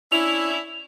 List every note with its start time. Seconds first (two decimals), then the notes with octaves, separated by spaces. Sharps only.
0.12 C#4 D4 E4 F7